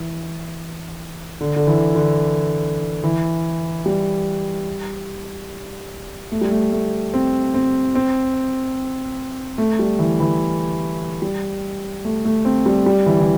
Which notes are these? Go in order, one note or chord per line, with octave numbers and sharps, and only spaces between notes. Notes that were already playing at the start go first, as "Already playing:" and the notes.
Already playing: E3
D3
D3
E3
D3
E3
G3
A3
G3
A3
A3
C4
C4
C4
A3
G3
E3
E3
G3
A3
A3
C4
G3
G3
E3
E3